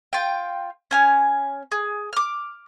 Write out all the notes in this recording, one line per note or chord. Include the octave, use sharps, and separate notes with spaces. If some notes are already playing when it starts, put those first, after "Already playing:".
F4 G5
C#4 G#5 F6
G#4
D6 F6